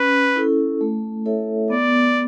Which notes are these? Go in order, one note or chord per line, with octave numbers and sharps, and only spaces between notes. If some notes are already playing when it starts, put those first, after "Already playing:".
Already playing: C#4 B4
E4 A4
A3
E4 A4 C#5 E5
B3 D5